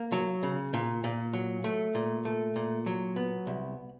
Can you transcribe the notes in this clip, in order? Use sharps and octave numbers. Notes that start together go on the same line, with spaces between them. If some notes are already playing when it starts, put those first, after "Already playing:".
Already playing: A#3
F#3
C#3
A#2
A#2
F#3
A3
A#2
A3
A#2
F#3
B3
C2